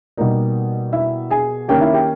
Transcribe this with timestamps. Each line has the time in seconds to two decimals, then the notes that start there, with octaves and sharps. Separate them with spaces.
0.17 B2 G3 A#3 D#4 D#5
0.93 E4 E5
1.30 G#4 G#5
1.68 D#3 A#3 C#4 G4 G5
1.81 E4 E5
1.93 G4 G5